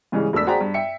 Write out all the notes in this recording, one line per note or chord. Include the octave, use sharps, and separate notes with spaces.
G#2 C#3 E3 G3 G#3
E1 A3 D4 E6 B6
F#4 G#4 C5 D5 G5 A#5
G2
E5 G5 C#7